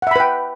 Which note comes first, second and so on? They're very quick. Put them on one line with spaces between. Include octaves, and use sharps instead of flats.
F#5 E5 B5 B4 G5